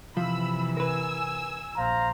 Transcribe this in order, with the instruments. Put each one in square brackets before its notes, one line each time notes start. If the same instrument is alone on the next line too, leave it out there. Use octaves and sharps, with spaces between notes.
[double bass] C3 E3 [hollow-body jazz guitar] F3 [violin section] B5 E6
[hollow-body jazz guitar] A#4 B4 [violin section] G#5 E6
[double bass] A#1 [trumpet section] C5 F5 A#5